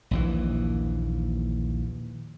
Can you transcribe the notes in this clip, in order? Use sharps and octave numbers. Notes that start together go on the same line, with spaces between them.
A#1 D#2 E3